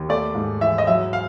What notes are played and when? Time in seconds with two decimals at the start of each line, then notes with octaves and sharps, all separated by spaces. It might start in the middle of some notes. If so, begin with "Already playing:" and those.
Already playing: D#2
0.09 A3 D5
0.35 G#2
0.61 E3 E5
0.78 D#5
0.87 F#3 E5
1.13 F5